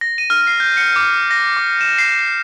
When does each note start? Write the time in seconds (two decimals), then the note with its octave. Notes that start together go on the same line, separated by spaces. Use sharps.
0.01 A#6
0.18 D#7
0.30 F6
0.47 C7
0.60 G6
0.77 C#7
0.96 D6
1.31 A#6
1.57 D6
1.81 E7
1.98 C7